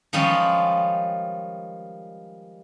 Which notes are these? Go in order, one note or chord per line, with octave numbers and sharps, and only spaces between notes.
D#3 F3 G3 G#3 C#4